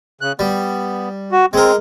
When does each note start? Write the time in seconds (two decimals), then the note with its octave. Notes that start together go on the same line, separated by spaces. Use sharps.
0.21 C#3 F#6
0.39 G3 B3
1.32 F#4
1.53 G#3 C4 A#4